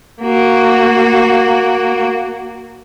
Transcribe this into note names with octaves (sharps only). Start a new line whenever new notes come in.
A#3 F#4